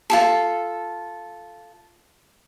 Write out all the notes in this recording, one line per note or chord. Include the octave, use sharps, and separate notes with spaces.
F4 G#4 A4